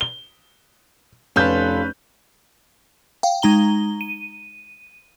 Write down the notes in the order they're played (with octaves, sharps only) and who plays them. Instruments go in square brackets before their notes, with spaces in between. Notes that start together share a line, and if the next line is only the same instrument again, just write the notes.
[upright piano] G7
[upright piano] F1 G6 [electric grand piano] C#4 B4 [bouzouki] F4 A4
[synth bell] F5 G5
G#3 D#4 A#5 G7
D#7